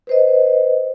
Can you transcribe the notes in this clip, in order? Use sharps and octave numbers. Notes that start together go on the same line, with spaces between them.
B4 C5 D#5